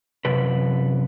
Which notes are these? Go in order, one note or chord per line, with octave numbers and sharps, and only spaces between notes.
F#2 C3 B4